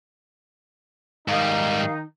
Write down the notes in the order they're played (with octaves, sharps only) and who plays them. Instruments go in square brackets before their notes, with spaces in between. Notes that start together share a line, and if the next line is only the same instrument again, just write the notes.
[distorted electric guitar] G#2 G3 [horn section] D#3 D#4 [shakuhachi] F5